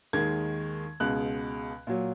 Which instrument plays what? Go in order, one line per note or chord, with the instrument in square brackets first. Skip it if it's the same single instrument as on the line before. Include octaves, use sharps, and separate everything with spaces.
[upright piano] D#2 D#3 G#3 G#6
C#2 B2 G#3 F#6
A#2 F#3